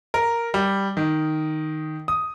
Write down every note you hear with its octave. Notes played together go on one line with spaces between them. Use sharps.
A#4
G3
D#3
D#6